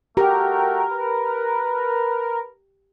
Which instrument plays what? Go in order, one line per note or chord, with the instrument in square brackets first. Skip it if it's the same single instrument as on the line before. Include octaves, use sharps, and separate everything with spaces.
[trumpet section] A3 F#4 G5 [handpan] G4 [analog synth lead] A#4
[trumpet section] B4